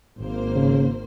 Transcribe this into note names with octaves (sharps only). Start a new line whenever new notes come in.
G#1 A#3 C5
C#3